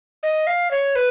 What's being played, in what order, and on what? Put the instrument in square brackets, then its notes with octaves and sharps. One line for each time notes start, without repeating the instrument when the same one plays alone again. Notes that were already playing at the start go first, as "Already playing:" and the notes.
[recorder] D#5
F5
C#5
B4